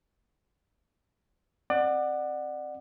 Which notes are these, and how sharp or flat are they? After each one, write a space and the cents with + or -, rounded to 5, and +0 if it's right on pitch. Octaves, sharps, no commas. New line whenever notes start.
C4 +25 D5 +30 F#5 +0